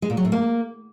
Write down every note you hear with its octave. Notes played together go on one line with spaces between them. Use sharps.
G#3
A#2
F#3
A2
A#3